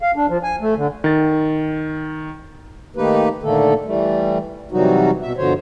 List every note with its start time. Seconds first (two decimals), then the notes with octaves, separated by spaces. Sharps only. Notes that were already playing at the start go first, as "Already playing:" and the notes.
0.02 F5
0.16 D4
0.29 F3
0.43 G#5
0.61 A3
0.77 D3
1.04 D#3 A6
2.96 D#3 A3 A#3 D#4 G4 B4
3.43 A#2 D3 D#3 A3 A#3 A4
3.85 E3 G3 A3
4.71 C3 E3 F#3 G3 D#4 F#4
5.22 B2 E5
5.37 G2 B2 D3 F3 C5 C#5